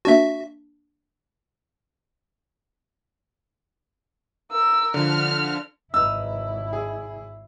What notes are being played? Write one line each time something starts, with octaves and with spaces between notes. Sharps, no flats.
A#3 D4 F#4 E5 A5
A#4 E6
D3 F3 F6
G#1 D#4 E4 B4 E6
G#4